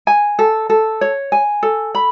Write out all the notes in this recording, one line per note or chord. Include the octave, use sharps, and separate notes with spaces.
G#5
A4
A4
C#5
G#5
A4
B5